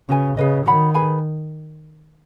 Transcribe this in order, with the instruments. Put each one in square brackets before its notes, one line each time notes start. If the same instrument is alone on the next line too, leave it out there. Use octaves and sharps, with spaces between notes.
[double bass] C#3 [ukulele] C#4 F#4 B4 G#5
[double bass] C#3 [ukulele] G#4 B4 D#5
[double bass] D#3 [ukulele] F#4 C#5 F#5 B5
[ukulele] G#4 B4 G#5 B5